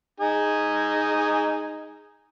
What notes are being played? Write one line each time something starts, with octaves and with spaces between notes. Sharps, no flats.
D#4 G#4